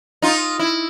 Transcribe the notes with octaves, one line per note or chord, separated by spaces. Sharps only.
D#4 F4
E4